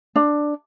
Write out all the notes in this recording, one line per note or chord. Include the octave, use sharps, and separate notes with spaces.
D4